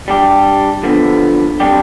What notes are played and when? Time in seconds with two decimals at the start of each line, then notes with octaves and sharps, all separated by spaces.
0.08 G3 D4 G4
0.83 D3 F3 B3
1.60 C3 G3 D4 G4